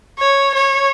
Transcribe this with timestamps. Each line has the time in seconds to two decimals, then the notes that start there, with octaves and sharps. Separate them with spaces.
0.19 C#5
0.55 C#5